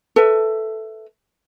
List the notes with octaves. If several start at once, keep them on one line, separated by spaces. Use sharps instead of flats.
A4 B4 E5